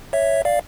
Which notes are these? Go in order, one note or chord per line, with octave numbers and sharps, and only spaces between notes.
C#5 E5
D5 F5